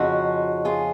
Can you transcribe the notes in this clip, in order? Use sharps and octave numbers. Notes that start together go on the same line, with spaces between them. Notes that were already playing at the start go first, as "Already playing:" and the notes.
Already playing: F2 C#3 F3 D#4 F#4
F4 G#4